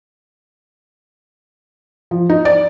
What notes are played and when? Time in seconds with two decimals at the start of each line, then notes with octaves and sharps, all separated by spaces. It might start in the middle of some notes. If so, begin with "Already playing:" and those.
2.11 F3
2.29 D#4
2.45 D5